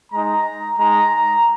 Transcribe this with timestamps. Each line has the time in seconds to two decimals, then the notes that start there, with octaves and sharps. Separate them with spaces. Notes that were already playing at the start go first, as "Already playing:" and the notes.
0.12 G#3 D#4 A#5
0.79 G#3 D#4 A#5